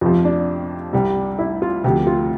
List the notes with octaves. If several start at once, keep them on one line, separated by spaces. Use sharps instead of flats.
F2 C3 F3 F4
D4
C2 C3 G3
E4
F4
D2 C3 F3 G4
F4